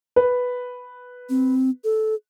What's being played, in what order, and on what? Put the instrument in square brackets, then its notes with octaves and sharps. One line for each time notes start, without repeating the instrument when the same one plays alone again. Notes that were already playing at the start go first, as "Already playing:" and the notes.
[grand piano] B4
[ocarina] C4
A4